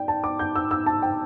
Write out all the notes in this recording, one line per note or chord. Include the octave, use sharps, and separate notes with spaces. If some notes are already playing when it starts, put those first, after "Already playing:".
Already playing: D5 G5
A5
D6
G6
E6
E6
A5
G5